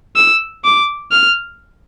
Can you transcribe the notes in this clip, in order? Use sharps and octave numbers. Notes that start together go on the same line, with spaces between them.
E6
D6
F6